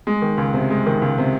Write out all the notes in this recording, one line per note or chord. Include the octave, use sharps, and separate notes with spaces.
G#3
D#3
C#2
C3
G#3
D#3
C#2
C3